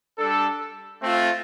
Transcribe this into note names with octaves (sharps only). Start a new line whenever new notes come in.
G3 D4 A4
A3 C4 F4